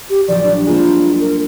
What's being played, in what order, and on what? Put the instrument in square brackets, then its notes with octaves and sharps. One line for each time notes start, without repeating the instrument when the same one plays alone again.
[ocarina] G4
[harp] A1 F3 F#3 [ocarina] D5
[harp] G3 D4
[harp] G#3 A#3 C4 [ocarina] F4
[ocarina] A#4